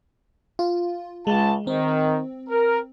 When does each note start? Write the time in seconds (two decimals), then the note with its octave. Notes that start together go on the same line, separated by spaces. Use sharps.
0.59 F4
1.27 C#2 G#3 A5
1.67 D#3 C4
2.50 A#4